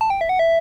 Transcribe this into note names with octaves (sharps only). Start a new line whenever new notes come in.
A5
G5
E5
F#5
E5